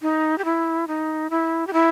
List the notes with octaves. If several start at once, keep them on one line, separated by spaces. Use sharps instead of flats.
D#4
G4
E4
D#4
E4
G4
E4